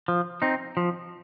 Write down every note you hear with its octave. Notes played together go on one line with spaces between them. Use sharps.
F3
C4 D#4
F3